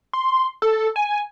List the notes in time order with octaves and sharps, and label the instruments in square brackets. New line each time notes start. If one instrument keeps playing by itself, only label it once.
[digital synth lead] C6
A4
G#5